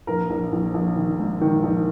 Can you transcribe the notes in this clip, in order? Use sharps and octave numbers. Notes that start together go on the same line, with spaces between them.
A#1 A#4
A#1
A#1
A#1
D#3
G#2
D#3
A#1